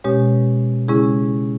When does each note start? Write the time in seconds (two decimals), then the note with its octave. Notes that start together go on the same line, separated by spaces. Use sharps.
0.04 B2 G#3 C#4 G4 C#5
0.88 C#3 G#3 C#4 E4 G#4